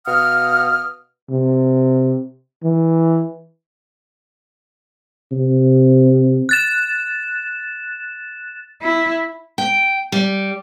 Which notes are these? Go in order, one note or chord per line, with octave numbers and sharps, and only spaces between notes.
B2 F5 F#5 D#6 F6
C3
E3
C3
F#6 A6 E7
E4
G5
G3